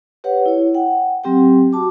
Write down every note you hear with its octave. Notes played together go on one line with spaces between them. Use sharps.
G4 B4 C#5 F#5
E4 C#5
F#5 G5
F#3 C4 G4 G5
F#4 A5 D6